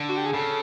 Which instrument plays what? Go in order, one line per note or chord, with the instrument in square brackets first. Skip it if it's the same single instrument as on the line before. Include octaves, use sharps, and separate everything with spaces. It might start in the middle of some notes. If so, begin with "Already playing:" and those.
Already playing: [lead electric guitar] D3
[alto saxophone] F#4
G4
G#4
[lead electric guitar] C#3 [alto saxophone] A4